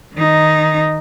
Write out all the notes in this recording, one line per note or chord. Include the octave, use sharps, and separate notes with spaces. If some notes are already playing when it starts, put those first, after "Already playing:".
D#3 D#4